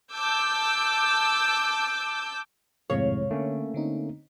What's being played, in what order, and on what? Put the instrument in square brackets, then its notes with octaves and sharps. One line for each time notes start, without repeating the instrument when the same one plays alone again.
[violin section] A5 D6 E6 G6
[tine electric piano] G#1 F2 A2 [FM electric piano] C3 G#3 F5 [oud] C#5
[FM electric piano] D3 [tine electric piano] A3 A#3 C#4
[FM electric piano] D3 C4 D#4